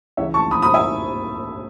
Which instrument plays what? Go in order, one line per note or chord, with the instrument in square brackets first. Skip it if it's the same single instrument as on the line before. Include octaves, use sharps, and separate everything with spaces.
[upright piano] C#2 C#3 E3 C#5 E5
A5 C#6
B5 D#6
B5 D#6
E5 G#5